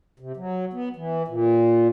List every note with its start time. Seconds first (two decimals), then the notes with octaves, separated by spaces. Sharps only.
0.20 C3
0.37 F#3
0.73 B3
0.96 E3
1.28 A#2